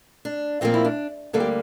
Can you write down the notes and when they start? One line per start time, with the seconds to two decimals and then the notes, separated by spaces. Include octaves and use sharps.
0.25 D4
0.61 A#2 F3 A#3 C4
0.74 E4
0.85 D4
1.33 D2 D3 G3 A#3 A4
1.40 G4